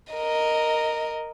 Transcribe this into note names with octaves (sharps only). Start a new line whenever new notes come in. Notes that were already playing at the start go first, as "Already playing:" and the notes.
A#4 D#5